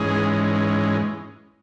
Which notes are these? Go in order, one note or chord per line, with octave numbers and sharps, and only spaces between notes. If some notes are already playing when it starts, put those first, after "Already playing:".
Already playing: G#2 E3 G#3 C#4 G#4